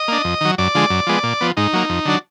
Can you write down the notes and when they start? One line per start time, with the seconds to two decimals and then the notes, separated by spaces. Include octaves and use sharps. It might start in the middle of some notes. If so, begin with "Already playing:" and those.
Already playing: D#5
0.08 A#3 D4
0.24 F2
0.41 D#3 F#3
0.58 F#2 D5
0.75 D3 F3 G#3
0.90 F#2
1.07 F3 G#3 B3
1.23 A#2
1.41 F3 B3
1.57 G#2 D#4
1.73 F#3 A#3
1.90 F2
2.05 D3 F#3 D4